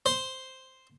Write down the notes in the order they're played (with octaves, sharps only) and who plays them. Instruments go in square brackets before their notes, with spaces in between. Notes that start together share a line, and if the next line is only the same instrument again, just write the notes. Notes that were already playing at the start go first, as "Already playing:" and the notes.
[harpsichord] C5